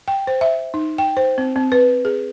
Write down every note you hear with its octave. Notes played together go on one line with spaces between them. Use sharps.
G5
C5
E5
D#4
G5
C5
C4
C4
B4
G#4